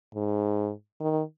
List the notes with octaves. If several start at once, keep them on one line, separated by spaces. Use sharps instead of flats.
G#2
D#3